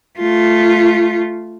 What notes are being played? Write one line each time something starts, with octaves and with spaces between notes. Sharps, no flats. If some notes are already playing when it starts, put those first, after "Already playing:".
A3 F4